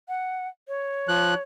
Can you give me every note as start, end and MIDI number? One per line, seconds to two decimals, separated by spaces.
0.08 0.48 78
0.68 1.42 73
1.08 1.34 53
1.08 1.34 90